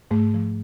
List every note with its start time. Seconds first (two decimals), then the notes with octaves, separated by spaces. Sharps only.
0.11 G#2 A3
0.34 F3